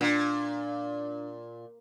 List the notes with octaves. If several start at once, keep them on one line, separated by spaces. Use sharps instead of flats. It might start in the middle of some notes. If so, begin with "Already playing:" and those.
A#2 D4